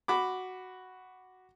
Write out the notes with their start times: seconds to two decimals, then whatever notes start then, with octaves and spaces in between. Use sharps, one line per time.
0.08 F#4 B5 D6